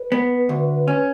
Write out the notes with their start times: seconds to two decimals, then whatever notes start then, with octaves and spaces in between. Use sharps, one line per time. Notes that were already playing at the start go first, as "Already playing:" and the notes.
Already playing: B4
0.12 B3
0.49 D2
0.88 C#4